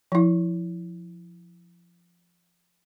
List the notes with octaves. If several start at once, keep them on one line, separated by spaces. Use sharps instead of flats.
F3 E4